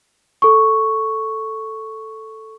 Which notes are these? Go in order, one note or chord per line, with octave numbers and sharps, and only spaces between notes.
A4 C#6